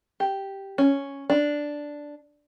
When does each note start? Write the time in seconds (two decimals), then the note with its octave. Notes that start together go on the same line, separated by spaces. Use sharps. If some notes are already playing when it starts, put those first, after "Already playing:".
0.20 G4
0.78 C#4
1.30 D4